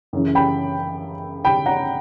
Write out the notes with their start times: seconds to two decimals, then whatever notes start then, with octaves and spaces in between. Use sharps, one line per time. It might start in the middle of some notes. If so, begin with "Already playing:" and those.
0.13 F#2 C#3 E3
0.35 G5 B5
1.45 G5 B5
1.66 F#5 A#5